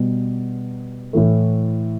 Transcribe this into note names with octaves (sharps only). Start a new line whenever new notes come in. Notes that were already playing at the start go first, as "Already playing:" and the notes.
Already playing: B2 G3 B3
A2 E3 A3